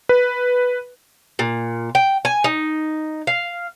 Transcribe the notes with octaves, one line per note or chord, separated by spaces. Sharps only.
B4
A#2
G5
G#5
D#4
F5